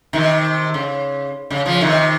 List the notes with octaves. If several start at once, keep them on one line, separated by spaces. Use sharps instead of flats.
C3 D#3
C#3
C#3
C#3 F3
C3 D#3